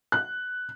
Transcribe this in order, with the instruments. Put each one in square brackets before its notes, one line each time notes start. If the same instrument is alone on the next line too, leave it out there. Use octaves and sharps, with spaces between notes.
[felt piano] F#6